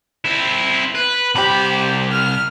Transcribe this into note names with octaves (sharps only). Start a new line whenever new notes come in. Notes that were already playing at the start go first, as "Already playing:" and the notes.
C4 E4
B4
C2 G4 C5 B5
F6